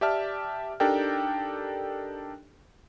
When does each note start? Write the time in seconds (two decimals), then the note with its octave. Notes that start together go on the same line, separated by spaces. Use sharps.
0.01 G4 D5 E5 A5 F6
0.80 D4 D#4 G4 A4 A#4 G5